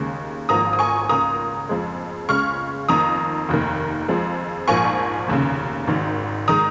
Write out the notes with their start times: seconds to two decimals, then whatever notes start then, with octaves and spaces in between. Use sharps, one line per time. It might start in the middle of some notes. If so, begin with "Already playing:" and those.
Already playing: D#2 C#3 G#3
0.49 G#1 G#2 F3 A#3 A#5 D#6
0.73 D#6
0.79 G#5 C#6
1.09 C#2 C#3 A#3 A#5 D#6
1.69 F2 F3 G#3
2.29 C#2 C#3 G#3 C#6 F6
2.89 F2 D#3 A#3 A#5 D#6
3.49 F1 D#2 D#3
4.08 F2 F3 G#3
4.68 A#1 G#2 F3 A#3 G#5 C#6
5.28 F1 D#2 C#3
5.87 G#1 G#2 D#3
6.48 D#3 G#3 A#5 D#6